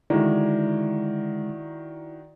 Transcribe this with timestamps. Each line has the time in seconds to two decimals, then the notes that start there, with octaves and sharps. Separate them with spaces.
0.10 D3 D#3 G#3 E4 F#4 D5